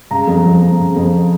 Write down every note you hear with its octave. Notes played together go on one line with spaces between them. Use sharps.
C#3 A#5
F2
F3
F2
C#3
F2